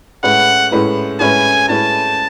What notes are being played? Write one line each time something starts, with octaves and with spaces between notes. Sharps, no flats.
A2 G#3 C#4 E4 B4 F#5
A2 G#3 C#4 E4 B4
A2 G#3 C#4 E4 B4 G#5
A2 G#3 C#4 E4 B4 A5